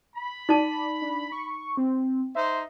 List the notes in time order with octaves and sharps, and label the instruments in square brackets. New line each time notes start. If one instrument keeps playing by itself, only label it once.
[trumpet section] B5
[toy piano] D#4 A5 [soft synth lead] D5
[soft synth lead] D4
C#6
C4
[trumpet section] D#4 C5 [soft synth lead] E5